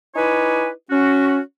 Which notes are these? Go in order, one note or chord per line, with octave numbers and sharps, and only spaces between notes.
D#4 E4 B4 C#5 D5 G#5
C#4 F#4